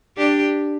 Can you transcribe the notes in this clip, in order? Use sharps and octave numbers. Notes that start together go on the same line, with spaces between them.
D4 G4